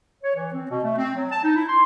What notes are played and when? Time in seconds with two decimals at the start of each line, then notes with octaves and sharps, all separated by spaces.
0.24 C#5
0.35 E3
0.53 C4
0.70 B2
0.84 A3
0.98 C4
1.15 F#3
1.31 A5
1.44 D#4
1.56 E4
1.68 C6